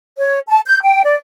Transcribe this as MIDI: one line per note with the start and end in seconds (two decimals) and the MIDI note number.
0.17 0.38 73
0.48 0.59 81
0.65 0.81 91
0.82 1.02 79
1.04 1.16 74